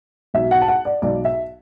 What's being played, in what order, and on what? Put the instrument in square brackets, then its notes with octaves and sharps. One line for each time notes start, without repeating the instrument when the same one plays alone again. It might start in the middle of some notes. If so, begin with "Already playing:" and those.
[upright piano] B1 B2 E5
F#5
A5
F#5
D5
B1 B2 D5
E5